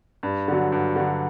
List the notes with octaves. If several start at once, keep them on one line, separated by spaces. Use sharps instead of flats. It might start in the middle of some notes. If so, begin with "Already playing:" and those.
G2
D3 F#3
G2
D3 F#3